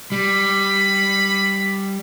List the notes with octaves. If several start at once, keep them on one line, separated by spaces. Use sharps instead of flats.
G3 B5